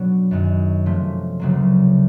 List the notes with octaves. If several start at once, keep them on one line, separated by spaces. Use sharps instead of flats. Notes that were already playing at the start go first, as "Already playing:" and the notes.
Already playing: B2 F#3 B3 D4 F#4
F#2 D#3 G#3 C#4
C3 F3 A3 C#4
D2 C#3 F#3 A#3